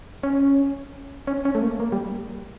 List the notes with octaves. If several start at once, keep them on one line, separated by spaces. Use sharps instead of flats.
C#4
C#4
C#4
A3
A#3
A#3
G3